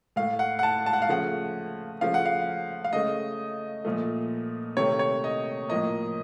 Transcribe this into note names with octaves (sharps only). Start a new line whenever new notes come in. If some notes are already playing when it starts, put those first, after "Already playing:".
A2 A3 F5
F#5
F#5
A5
A5
F#5
F5
C#3 F3 A3 F#5
C#3 F3 A3 F5
F#5
F5
F5
C#3 A3 D#5
A#2 F3 A3
C3 D#3 A3 C#5
C#5
D#5
A2 F3 A#3 D#5